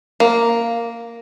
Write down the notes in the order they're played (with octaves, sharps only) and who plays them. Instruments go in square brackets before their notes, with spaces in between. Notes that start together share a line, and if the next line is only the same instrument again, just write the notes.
[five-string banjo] A#3